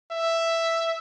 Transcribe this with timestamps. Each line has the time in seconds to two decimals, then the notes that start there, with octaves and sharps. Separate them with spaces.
0.12 E5